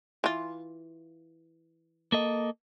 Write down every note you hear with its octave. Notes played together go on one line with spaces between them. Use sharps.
E3 F4
A#3 A4 D#5